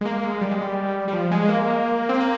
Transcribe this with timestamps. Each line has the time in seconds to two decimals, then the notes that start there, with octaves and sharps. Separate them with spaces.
0.01 G#3
0.05 A#3
0.24 G#3
0.41 G3
0.51 G#3
0.61 G3
1.08 G3
1.13 F3
1.31 G#3
1.48 A#3
2.09 C4
2.20 A#3